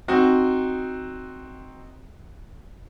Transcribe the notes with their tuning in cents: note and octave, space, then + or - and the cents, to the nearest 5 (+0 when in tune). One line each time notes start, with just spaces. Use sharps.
C4 +0 D#4 +0 F#4 +0